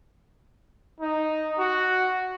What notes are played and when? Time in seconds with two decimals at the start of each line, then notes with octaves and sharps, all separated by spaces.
1.00 D#4
1.59 F#4